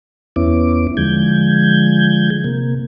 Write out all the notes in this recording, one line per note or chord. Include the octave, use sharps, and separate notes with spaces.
E2 B3 C#4 E4 D6
D3 F3 G#3 G6 G#6
C3 A#3